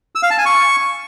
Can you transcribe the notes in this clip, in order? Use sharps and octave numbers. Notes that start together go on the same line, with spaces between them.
E6
F5
A5
G#5
C#6